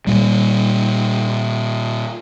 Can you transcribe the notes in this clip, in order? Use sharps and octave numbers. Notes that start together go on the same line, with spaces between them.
A#2 G3